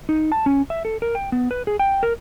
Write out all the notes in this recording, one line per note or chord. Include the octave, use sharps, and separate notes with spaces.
D#4
A5
C#4
E5
A4
A#4
G5
B3
B4
G#4
G5
A#4